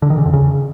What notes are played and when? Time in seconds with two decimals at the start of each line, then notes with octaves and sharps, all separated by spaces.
0.02 D3
0.10 D#3
0.18 C#3
0.26 F2
0.33 C#3